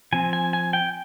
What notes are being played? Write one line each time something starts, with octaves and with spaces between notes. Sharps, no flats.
F3 C4 G#5
G#5
G#5
G5